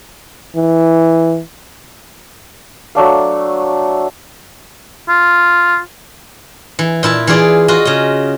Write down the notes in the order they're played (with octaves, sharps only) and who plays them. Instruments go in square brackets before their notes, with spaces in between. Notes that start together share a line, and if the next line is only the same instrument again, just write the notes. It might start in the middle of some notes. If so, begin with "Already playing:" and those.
[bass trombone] E3
[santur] F#3 A3 D4 F5
[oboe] F4
[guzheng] E3
A#2 E4 A5
E3 F4 G#4 D5
F4 F#4 D#5
C#3 D#5